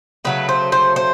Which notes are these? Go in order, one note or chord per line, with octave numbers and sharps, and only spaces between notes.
C#3 F#3 A3 B4
C5
C5
C5